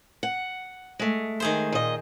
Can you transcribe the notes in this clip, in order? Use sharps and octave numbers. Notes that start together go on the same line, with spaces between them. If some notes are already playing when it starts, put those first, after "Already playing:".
F#5
G#3 A3
D#3 G#4 C5
A#2 D#5